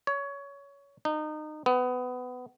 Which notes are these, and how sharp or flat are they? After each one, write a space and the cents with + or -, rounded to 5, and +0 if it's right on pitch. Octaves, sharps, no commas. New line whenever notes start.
C#5 +20
D#4 -25
B3 +20